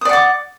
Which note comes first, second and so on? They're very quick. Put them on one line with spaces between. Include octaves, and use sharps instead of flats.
D#6 D5 F#5 D6